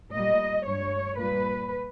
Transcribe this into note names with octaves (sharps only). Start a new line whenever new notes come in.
A#2 G3 D#5
G2 G3 C#5
A#2 G3 B4